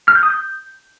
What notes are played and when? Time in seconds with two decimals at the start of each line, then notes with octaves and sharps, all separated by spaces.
0.08 F6
0.15 G6
0.23 D#6
0.30 G6